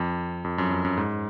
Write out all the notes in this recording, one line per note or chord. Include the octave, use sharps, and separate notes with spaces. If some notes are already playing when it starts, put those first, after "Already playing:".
Already playing: F2
F2
F#2
F2
F#2
G#2